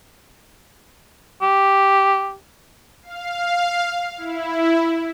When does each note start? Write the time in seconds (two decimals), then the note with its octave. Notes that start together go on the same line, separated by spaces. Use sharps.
1.42 G4
3.03 F5
4.17 E4